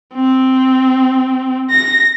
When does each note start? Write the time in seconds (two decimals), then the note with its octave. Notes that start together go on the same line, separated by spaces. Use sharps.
0.14 C4
1.70 A#6